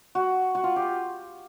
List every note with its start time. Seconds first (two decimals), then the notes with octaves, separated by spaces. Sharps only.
0.15 F#4
0.55 F#4
0.64 F4
0.76 G4